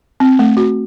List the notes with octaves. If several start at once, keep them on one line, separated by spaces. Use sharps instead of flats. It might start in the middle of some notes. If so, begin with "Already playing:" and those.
C4
A3
F#4